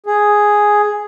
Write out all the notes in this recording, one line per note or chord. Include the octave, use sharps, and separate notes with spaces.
G#4